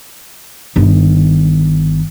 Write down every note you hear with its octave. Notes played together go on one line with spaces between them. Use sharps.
G1 D#3